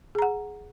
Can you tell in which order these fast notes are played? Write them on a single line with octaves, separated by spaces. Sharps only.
G#4 A#5 F#5